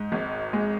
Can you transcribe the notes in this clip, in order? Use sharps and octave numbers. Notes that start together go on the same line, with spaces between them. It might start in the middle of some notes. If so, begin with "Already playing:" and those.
Already playing: G#2
G#1
G#3